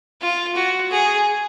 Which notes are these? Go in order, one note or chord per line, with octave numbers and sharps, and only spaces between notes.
F4
F#4
G#4